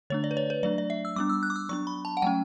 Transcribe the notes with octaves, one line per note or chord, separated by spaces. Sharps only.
D3 A3 D4 C#5
D5
B4
C#5
B4
F#3 A3 D4 D5
D5
E5
E6
G3 B3 D4 D6
E6
F#6
D6
E6
F#3 B3 D4 C#6
B5
A5
F#5
F#3 A3 C#4 G5